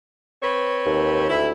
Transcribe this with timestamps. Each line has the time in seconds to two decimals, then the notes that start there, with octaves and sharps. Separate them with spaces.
0.43 C4 B4 C#5
0.86 D#2
1.30 D2 E4